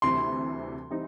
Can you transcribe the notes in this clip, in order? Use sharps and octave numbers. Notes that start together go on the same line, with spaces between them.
D2 C3 E3 G3 C4 C6
E3 G3 C4 D#4